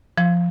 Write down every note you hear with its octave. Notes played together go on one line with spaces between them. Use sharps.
F3